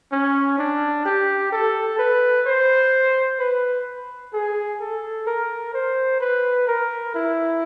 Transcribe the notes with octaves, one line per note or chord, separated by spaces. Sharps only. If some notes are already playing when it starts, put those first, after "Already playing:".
C#4
D4
G4
A4
B4
C5
B4
G#4
A4
A#4
C5
B4
A#4
E4